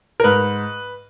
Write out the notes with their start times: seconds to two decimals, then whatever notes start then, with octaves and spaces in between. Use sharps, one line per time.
0.20 A#4
0.24 G#2 B4